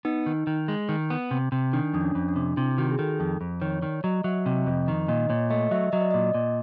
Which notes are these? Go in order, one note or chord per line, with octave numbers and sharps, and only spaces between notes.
B3 D#4
D#3
D#3
G#3
D#3
B3
C3
C3
D#3 D4
F2 D4
C#4
F2
D4
C3
C3 E4
D#3 F#4
G4
G#4
D#3 A4
F2
F2
D#3 C#5
D#3 D5
F#3 D#5
F#3 E5
C3 D#5
F2 D#5
D#3 D#5
A#2 D#5
A#2 C#5
A3 D#5
F#3 E5
F#3 D#5
D5
A#2 D#5
A#2